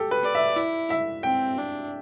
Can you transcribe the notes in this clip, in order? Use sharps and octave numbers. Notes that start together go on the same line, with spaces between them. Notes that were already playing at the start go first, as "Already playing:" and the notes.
Already playing: G4 A4
B4
D5
E5
E4
E5
C4 G5
D4